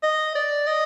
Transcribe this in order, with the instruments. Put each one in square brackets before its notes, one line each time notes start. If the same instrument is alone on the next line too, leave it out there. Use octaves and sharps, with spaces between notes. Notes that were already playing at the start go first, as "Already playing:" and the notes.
[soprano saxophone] D#5
D5
D#5